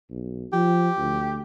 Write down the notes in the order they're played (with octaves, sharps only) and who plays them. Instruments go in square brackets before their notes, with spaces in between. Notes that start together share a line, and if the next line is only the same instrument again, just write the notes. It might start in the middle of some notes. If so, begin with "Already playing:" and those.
[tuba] B1
[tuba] F3 [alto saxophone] G4
[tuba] D2